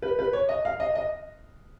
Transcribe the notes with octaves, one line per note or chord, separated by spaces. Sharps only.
B4
B4
C#5
D#5
F5
D#5
D#5